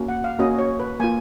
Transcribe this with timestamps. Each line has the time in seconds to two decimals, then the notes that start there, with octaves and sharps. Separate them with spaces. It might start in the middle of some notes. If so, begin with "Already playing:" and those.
Already playing: A#3 C#4 F#4
0.08 F#5
0.24 F5
0.39 A#3 C#4 F#4 D#5
0.59 C#5
0.80 B4
1.00 A#3 F4 G#5